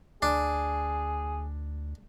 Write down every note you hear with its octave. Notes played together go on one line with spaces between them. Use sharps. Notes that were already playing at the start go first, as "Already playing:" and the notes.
D2 D4 G#4